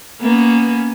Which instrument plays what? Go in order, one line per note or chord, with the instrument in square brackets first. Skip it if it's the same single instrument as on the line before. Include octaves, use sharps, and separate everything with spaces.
[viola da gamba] A#3 B3 C#4